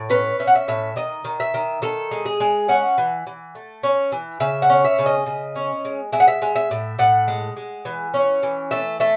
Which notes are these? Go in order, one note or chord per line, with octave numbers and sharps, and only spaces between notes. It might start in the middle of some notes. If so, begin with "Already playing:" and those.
Already playing: A2
C#4 B4
C#4 E5
F#5
E5
A2 E5
D#3 D#5
D#3
E5
D#3
D#3 A4
G#3
G#4
G#3
C#4 F#5
E3
E3
A3
C#4
E3
C#3 E5
F#5
C#4
E5
C#3
D#5
C#3
C#4
G#3
G#3 E5
F#5
E5
G#3
E5
A2
A2 F#5
G#3
G#3
E3
C#4
E3
A3 E5
A3 E5